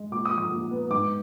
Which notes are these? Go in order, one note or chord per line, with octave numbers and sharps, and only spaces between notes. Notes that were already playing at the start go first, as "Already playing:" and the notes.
Already playing: G#3
A#2 D6
D#6
F3
D#6
A#2
B3
G#2 D6